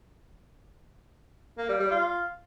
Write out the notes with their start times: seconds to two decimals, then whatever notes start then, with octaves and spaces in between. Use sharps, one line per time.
1.58 A#3
1.69 G3
1.80 G3
1.91 F4